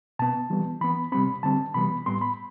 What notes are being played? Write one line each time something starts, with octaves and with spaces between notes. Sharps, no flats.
B2 B3 A5
E3 G3 B3
E3 B3 B5
C3 G3 C4 B5
D3 G3 C4 A5
C3 E3 G3 B3 B5
A2 G3 B3 C6
B5